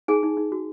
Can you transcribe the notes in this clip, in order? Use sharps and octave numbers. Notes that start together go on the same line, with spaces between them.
D#4 G#4 G#5
D#4
D#4
F#4